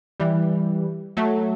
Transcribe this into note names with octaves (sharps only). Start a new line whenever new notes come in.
E3 G3
F#3 A3